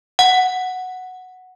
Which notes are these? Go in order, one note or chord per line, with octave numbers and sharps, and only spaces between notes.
F#5